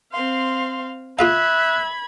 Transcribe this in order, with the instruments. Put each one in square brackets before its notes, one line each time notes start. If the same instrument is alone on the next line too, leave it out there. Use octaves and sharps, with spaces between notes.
[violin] C4 F5 [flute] C6
[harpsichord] F4 G#4 F5 [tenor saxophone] E5 [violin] B5 G#6 [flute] F#6